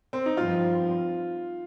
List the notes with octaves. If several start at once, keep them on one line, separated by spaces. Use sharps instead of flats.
C4
D#4
G2 F3 C4 F4